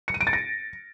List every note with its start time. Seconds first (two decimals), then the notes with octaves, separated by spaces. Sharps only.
0.08 C#7
0.14 D#7
0.21 D7
0.27 A6
0.33 A#6